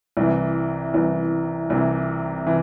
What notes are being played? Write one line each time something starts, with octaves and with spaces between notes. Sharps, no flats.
C2 C3 E3
C2 C3 E3
C2 C3 E3
C3 E3